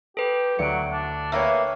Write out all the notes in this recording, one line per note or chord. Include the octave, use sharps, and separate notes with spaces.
G4 A4 B4
D2 F#3 C#7 D7
D4
A#3 A#4 B4 C#5 E5 G5 A#5